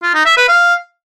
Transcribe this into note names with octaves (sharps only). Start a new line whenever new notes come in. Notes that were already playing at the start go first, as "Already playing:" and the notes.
F4
D#4
E5
B4
F5